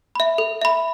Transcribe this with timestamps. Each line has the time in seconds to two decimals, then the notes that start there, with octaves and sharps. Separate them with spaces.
0.15 E5 B5
0.38 A4
0.62 E5 B5